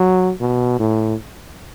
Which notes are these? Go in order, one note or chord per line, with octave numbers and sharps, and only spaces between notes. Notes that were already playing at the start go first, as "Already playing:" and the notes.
Already playing: F#3
B2
A2